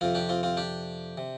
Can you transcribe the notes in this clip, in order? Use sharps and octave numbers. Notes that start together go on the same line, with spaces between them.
F2 C3 C4 F4
D4 G4
C4 F4
C4 F4
D4 G4
C3